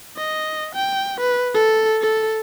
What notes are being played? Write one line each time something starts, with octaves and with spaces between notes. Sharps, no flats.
D#5
G5
B4
A4
A4